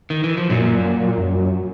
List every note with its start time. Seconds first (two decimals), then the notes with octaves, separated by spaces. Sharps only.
0.10 D#3
0.24 E3
0.38 F3
0.50 F#2 A#2 F#3
1.18 F#2